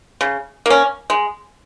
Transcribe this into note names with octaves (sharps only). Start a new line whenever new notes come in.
C#3
A#3 C#4
G#3